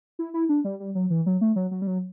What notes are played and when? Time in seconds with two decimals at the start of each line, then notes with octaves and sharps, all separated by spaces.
0.19 E4
0.34 E4
0.49 D4
0.64 G3
0.80 G3
0.95 F#3
1.10 E3
1.26 F#3
1.41 A3
1.56 F#3
1.71 F#3
1.82 G3
1.87 F#3